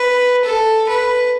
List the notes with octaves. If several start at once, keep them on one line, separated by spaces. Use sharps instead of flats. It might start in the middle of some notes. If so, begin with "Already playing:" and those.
Already playing: B4
A4
B4